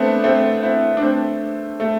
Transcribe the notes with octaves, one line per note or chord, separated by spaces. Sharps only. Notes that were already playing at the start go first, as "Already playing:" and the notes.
Already playing: A3 B3 C4 D4
A3 C4
C4 E4
D4
A3 C4
A3